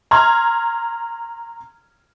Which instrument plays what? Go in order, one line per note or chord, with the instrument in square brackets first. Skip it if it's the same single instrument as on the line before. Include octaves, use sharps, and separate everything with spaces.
[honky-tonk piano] A#5 C6 F6 G#6